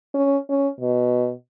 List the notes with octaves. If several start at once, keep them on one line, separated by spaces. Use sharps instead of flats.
C#4
C#4
B2